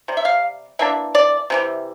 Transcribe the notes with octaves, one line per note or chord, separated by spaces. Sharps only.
C3 G3
E5
F5
E3 A#3 D4 E5
D5
C3 E3 G3